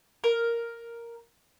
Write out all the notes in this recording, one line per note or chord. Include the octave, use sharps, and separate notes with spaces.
A#4